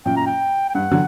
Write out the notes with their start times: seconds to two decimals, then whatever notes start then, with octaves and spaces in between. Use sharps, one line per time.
0.06 F#2 A#2 G5
0.17 A#5
0.26 G5
0.69 G5
0.75 G2 F#5
0.91 D3 F#3